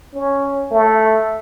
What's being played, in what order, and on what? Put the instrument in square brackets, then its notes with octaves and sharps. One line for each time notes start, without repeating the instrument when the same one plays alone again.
[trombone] C#4
A3